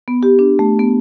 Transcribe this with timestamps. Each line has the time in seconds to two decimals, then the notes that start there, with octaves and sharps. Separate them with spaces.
0.08 B3
0.23 G4
0.39 D4
0.59 A3
0.79 B3